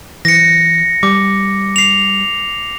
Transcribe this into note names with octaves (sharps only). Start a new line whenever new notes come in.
E3 A#6 C#7
G3 D6
C7 F7